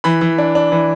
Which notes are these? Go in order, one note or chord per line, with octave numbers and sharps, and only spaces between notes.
E3 B5
E3
D4
D4
E3